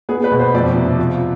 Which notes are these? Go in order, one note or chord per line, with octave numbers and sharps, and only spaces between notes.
B3 G#4
B4
B2
C5
F2 D5
C3
F4